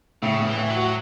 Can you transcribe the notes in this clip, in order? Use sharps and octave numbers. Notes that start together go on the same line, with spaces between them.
A2 C#3
A2
E3
A2
F#3
F#4